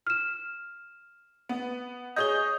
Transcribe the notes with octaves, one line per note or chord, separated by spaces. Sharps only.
F6 E7
B3
G#4 C#5 D#5 G6 G7